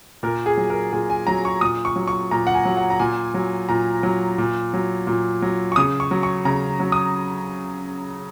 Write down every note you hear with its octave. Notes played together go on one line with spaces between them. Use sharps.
A#2 A#4
G#4
F#3
A#4
A#2 G#4
G#5
F#3 A#5
C#6
A#2 D#6
C#6
F#3
C#6
A#2 A#5
F#5
G#5
F#3
F#5
A#5
A#2 G#5
F#3
A#2 A#5
F#3
A#2
F#3
A#2
F#3
C#6
C#3 D#6
C#6
F#3
C#6
C#3 A#5
F#3
D#6